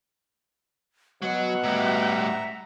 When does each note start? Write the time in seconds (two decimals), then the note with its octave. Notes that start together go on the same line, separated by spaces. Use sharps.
1.22 B2 F#3 F#5
1.63 A2 G3 E5 A#5